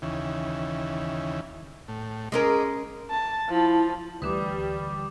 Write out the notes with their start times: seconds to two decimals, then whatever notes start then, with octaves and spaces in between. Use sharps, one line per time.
0.02 D#2 C#3 E3
1.88 A2
2.32 G#3 C#4 A#4 D#5 D6
3.10 A5
3.49 F3 E4
4.22 D2 D3 E3 G3 B4 D6 D#6